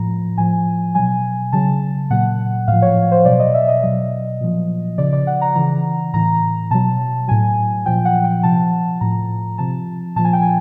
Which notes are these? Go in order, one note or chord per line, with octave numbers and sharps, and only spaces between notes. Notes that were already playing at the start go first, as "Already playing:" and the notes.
Already playing: A2 F3 A#5
A2 F3 G#5
B2 F#3 G#5
C#3 F#3 A5
A#2 F#3 F#5
A2 F3 F5
C#5
C5
B2 F#3 D5
D#5
E5
D#5
B2 F#3 D#5
A#2 F3
C#3 F3 D5
D5
F#5
A#5
C#3 E3 A#5
A2 E3 A#5
B2 F#3 A5
A2 F#3 G#5
A#2 F3 G5
F#5
G5
C3 F3 A5
A2 F3 A#5
C3 F3 A5
A#2 F3 A5
G#5
G5
G#5